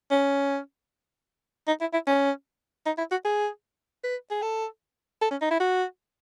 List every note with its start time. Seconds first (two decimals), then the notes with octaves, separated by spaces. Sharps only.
0.11 C#4
1.67 D#4
1.81 E4
1.93 E4
2.07 C#4
2.86 D#4
2.98 E4
3.11 F#4
3.25 G#4
4.04 B4
4.31 G#4
4.42 A4
5.21 A4
5.31 C#4
5.41 D#4
5.51 E4
5.60 F#4